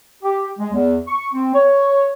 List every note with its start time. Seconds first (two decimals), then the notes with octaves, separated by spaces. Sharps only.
0.22 G4
0.59 G#3
0.73 E2
1.08 C#6
1.33 C4
1.54 C#5